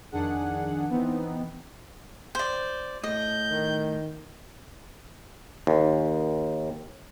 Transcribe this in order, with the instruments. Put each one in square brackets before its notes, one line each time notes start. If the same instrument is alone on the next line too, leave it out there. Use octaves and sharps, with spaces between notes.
[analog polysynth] F2 D#3 D4 G#4 F#5
E3 B3 C4 D#4
[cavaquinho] C5 D5
[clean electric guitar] A2 [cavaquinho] D#5 [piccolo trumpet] G6
[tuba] D#3
[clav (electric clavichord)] D#2